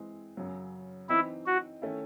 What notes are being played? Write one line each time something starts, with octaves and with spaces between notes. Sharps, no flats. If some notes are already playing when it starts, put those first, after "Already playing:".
Already playing: E3 G#3 C4
F#2 C#3 F#3
E3 C4 D#4 E4
F#4
D#3 A3 C#4 E4